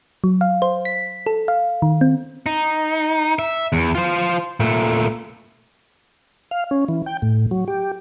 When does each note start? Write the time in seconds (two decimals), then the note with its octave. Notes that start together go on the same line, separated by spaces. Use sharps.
0.24 F#3
0.41 F5
0.62 C5
0.85 B6
1.26 A4
1.48 F5
1.82 D#3
2.01 C4
2.46 D#4
3.39 E5
3.73 E2
3.95 F4 C5
4.60 A#2 A3
6.51 F5
6.71 C#4
6.88 E3
7.06 G5
7.22 A2
7.51 F#3
7.68 G4